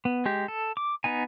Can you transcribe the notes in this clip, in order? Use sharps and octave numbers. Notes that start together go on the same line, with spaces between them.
B3
G#3 G4
A4
D6
B3 D#4 G#5